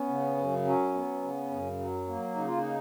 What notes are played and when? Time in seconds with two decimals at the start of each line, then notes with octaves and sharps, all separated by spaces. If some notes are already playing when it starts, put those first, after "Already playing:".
Already playing: B3 C#4
0.09 C#3
0.37 F#2
0.65 F#3 C#4
0.94 B3
1.22 C#3
1.51 F#2
1.79 F#3
2.08 A#3
2.35 C#3 D#4
2.47 F4
2.57 D#4